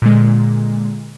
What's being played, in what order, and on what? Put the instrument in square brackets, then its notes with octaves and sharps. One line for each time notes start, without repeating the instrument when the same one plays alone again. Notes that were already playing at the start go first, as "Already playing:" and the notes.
[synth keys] A#2 D3 G#3